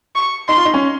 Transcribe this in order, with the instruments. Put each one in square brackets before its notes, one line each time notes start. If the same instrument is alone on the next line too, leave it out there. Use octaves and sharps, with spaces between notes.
[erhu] C#6
[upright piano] D#4 [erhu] C6
[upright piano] F4
D#4
C#4